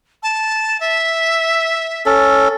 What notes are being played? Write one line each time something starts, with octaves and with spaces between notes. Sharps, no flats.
A5
E5
C#4 A4